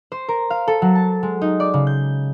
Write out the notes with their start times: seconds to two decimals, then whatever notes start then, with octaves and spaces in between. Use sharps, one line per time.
0.12 C5
0.28 A#4
0.50 F5
0.68 A4
0.82 F#3
0.95 A5
1.23 G#3
1.41 D#4
1.60 D5
1.74 C#3
1.87 G6